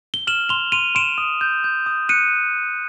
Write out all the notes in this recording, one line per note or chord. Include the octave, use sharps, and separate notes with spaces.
G7
F6 E7 F#7
C6 F7 G7
C6 D#7 F7
C6 D7 E7
D#6
G6
G6
D#6
F#6 C#7 D#7